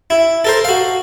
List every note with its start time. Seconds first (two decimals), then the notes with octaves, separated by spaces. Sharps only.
0.10 E4
0.45 A4 A#4 C5
0.65 F#4 F5